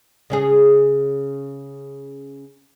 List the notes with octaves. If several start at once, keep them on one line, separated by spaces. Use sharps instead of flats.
C#3 C#4 G#4